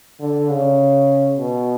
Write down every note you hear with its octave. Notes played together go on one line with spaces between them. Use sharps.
D3
C#3
B2